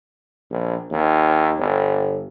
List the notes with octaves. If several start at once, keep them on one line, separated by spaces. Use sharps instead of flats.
A#1
D#2
G1